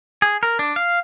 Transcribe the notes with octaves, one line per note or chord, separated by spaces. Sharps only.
G#4
A#4
D4
F5